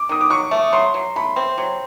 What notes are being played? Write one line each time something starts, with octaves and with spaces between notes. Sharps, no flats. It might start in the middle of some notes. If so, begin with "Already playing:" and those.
Already playing: D6
D#3 D#6
D6
F#3 C#6
A3
F#3 C6
F#3
A3 B5
C4
F#3